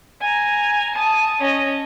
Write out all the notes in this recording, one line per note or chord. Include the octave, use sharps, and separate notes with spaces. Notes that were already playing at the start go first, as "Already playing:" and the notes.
G#5 A#5
A5 D#6
C#4 D#5